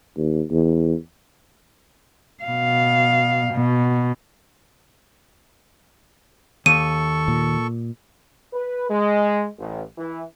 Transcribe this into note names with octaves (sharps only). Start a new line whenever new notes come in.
D#2
E2
B2 F5
B2
D#2 A4 C#6 D#7
A#2
B4
G#3
A1
E3